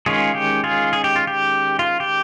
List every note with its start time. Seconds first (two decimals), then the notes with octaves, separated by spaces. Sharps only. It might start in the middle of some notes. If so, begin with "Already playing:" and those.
0.06 D#3 G#3 C#4 F4 G#4
0.35 G4
0.64 F4 G#4
0.93 G#4
1.04 G4
1.16 F4
1.27 G4
1.79 F4
2.00 G4